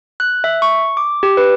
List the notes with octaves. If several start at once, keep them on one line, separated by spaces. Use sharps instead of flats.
F#6
E5
C#6
D6
G4
B4